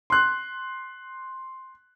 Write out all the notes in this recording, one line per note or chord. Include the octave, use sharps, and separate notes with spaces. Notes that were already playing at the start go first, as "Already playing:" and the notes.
C6 F#6